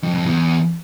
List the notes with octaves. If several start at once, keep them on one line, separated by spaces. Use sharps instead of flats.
F2
F2
E2